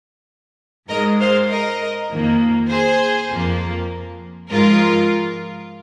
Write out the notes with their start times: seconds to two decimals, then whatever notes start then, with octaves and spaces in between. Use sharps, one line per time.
0.89 G#2 G#3 A#4 D#5
1.19 C5 F5
1.50 A#4 D#5
2.10 F2 D#3 A#3
2.70 G#4 C5
3.30 F2 F3 A#3
4.50 G#2 F3 G#3 F4 A#4